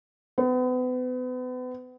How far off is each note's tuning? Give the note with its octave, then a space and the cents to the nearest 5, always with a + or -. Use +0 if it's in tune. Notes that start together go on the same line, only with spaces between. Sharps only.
B3 +35